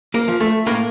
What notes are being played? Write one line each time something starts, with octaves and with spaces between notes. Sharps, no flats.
A#3 A#4
F3
A3 A4
A2 A#3 A#4